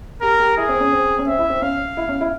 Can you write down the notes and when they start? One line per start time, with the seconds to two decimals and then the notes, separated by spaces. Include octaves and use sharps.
0.21 G4 A#4
0.39 G4
0.57 E4 G#4
0.69 C4
0.80 C#4
0.92 C4
1.19 C#4
1.27 C4 E5
1.39 E4
1.50 C4
1.62 C#4 F5
1.97 E4
2.08 C#4
2.21 E4